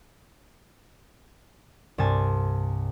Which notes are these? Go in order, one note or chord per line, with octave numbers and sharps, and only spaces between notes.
C2 G2 G#5 A5